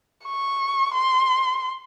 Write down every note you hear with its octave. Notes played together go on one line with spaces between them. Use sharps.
C#6
C6